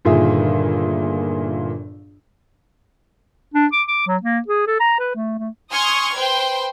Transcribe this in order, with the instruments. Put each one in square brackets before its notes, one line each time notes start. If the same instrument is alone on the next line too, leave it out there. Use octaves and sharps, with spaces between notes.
[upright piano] G1 A#2 D#3 F4 G#4 E5
[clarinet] D4
D6
D6
F#3
A#3
G#4
A4
A#5
B4
A3
A3
[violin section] G#5 C6 C#6 D#6 F6 G#6
B4 C5 G5 C6